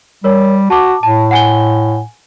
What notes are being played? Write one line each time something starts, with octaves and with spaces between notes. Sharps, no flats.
G3 A#4 C#5
F#4 A5 D6
A2 A5
F#5 G#5 G7